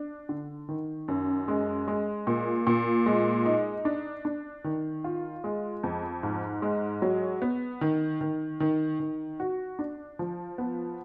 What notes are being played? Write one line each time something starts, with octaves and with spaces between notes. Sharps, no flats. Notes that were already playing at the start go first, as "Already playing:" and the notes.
Already playing: D4
D3
D#3
F#2
G#3
G#3
A#2
A#2
G#3
D#4
D4
D4
D#3
F4
G#3
F2
G#2
G#3
F#3
B3
D#3
D#3
D#3
D#3
F#4
D4
F3
B3